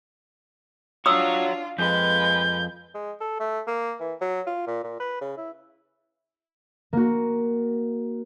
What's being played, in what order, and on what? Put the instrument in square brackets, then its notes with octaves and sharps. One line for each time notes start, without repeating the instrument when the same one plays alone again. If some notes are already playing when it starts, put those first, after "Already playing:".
[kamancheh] D4 F4 [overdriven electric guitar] F#4 C#5 [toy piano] D#6 E6
[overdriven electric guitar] F2 [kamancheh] G#3 B4 [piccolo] G6
[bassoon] G#3
A4
A3
A#3
E3
F#3
F4
A#2
A#2
B4
C#3
E4
[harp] A#3 F#4